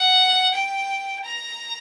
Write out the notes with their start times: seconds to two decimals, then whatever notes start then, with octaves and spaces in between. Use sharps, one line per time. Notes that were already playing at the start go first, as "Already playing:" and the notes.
Already playing: F#5
0.55 G5
1.25 A#5